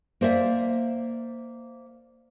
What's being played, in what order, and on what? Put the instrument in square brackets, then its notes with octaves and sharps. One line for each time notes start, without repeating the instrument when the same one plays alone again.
[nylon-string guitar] A#3 C5 D5 E5